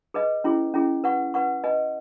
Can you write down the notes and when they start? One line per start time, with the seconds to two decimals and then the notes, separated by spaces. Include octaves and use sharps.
0.14 G#4 B4 D#5
0.44 C#4 E4 G#4
0.74 C#4 E4 G#4
1.04 B4 F#5 C#6
1.34 B4 F#5 C#6
1.64 B4 D#5 G#5